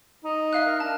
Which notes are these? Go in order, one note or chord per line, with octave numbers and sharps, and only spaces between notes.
D#4
E5 F5 F#6
A#4
D4 A5